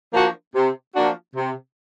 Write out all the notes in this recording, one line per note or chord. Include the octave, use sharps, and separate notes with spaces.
F3 A#3 D4 F#4
C3
F3 A#3 D4 F#4
C3